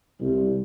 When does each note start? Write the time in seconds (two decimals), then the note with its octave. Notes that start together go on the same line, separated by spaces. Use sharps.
0.20 C2